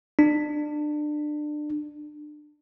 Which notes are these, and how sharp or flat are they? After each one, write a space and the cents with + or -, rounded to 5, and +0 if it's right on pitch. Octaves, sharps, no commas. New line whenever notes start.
D4 +25